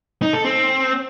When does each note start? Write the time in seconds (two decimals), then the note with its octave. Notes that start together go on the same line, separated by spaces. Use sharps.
0.22 D#4
0.33 A4
0.45 C4